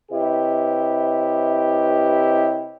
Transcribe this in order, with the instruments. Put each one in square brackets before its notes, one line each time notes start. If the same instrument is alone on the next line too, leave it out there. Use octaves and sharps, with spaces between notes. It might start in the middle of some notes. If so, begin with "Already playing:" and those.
[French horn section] C3 E4 G4 B4 C#5 D#5